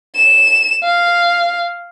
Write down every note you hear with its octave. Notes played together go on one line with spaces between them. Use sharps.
E7
F5